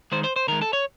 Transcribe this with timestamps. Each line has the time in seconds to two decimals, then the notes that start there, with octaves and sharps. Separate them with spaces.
0.12 D#3 G#3 C5
0.24 C5
0.36 C5
0.48 D#3 G#3 A#4
0.62 A4
0.73 C#5